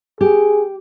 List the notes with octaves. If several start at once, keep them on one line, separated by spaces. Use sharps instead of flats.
G4 G#4